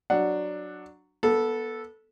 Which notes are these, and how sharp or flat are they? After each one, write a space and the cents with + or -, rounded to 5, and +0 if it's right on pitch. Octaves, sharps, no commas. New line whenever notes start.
F#3 +0 D4 +10 F#5 +0
B3 -25 A4 +0